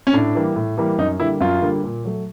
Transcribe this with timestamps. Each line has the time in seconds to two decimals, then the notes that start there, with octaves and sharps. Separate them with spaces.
0.07 C#4
0.13 A2 D4
0.35 E3 G3 A#3
0.56 A2
0.77 E3 G3 A#3
0.98 F#2 D#4
1.20 D3 G3 A#3 E4
1.41 F#2 F4
1.62 D3 G3 A#3
1.84 A#2
2.04 F#3 A3